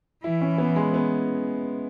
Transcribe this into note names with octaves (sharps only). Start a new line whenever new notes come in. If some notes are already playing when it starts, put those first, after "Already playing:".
E3 E4
C#4
B3
G#3
B3